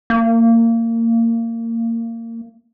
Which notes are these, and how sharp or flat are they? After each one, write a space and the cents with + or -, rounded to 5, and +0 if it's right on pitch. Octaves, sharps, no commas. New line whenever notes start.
A#3 -25